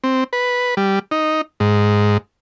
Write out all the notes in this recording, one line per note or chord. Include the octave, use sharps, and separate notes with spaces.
C4
B4
G3
D#4
G#2